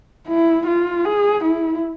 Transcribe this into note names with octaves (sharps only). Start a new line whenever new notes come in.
E4
F4
G#4
E4